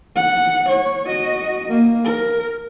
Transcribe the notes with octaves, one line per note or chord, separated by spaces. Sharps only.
F#5
C#5
F#4 D#5
A#3
A#4